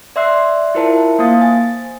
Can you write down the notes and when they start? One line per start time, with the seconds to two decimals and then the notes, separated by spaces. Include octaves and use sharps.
0.16 D5 E5 C6 E6 F#6 C7
0.75 E4 F4 A#4 C5 E5 A5
1.19 A#3 C5 F5 D#6 A6
1.41 G#5 A6